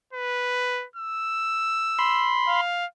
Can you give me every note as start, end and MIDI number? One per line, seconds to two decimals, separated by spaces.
0.13 0.85 71
0.96 2.35 88
1.99 2.61 83
1.99 2.61 84
2.48 2.86 77